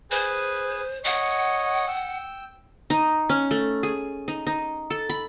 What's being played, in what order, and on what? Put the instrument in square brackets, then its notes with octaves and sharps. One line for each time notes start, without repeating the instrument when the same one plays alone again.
[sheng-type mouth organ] G#4 B4 G#5 [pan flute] C5
[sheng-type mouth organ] C#5 D#5 [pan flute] F#5
[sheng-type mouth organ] G5 E6
[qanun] D#4
C#4
A3
G#4
D#4
D#4
A4
B5